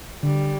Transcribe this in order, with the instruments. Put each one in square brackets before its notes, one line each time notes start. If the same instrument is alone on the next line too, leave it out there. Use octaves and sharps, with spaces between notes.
[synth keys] D3 [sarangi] G3